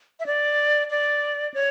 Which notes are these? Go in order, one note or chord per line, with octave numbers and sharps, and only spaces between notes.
E5
D5
D5
C#5